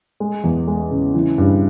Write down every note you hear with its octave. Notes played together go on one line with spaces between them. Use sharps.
G#3
E2
G#3
C#3
E3
G2